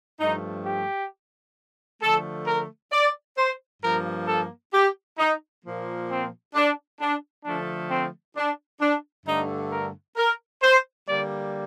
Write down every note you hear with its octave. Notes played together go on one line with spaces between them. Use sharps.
G2 F3 A3 D#4
G4
D3 F3 A3 A4
A#4
D5
C5
G2 F3 A#3 A#4
A4
G4
D#4
A#2 F3 A#3
C4
D4
D4
D3 F3 A3 D4
C4
D4
D4
G2 D3 A3 D#4
A#4
A#4
C5
D3 G3 A#3 D5